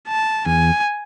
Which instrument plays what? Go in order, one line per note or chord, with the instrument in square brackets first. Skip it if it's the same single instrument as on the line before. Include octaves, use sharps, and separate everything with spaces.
[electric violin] A5
[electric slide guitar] E2 [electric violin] G#5